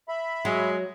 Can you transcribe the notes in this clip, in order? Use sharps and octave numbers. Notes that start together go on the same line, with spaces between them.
E5 B5
F#3 G#3